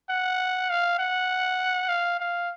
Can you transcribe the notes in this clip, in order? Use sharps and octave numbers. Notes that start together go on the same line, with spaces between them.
F#5
F5
F#5
F5
F5